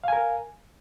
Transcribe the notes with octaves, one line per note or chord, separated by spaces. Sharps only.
A#4 F5 G#5